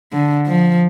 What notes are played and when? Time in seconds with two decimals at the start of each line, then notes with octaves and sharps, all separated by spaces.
0.13 D3
0.46 F3